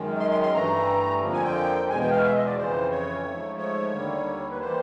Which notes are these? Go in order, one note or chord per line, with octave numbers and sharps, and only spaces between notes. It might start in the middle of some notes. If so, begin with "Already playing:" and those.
Already playing: F#2 D#3 G#3
C6
C6
C6
G2 E3 A3 A#5
F2 D3 F3 A#3
G#5
G5
E2 B2 G#3 G#5
G5
F5
E5
D#5
D5
F2 C#3 E3 C5
C#5
G#2 F3 A3
C#5
D#2 D3 G3 A#3
B4
E3 G3 A#3 C5